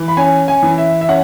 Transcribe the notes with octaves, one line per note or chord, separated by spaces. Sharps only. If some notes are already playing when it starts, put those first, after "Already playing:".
Already playing: E3
B5
C#4 G#5
G#5
E3
E5
E5
C#4 F#5